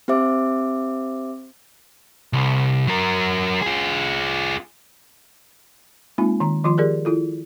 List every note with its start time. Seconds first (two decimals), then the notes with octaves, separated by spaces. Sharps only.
0.08 C4 G4 C5 E5 D6
2.33 C2
2.87 F#3 A#4
3.62 F4 G#4
6.18 G#3 A#3 C4 D#4 F4
6.40 D#3 A#5
6.64 D#3 F3 F4 C6
6.78 G4 G#4 A#4 D5
7.05 E4 F4 A4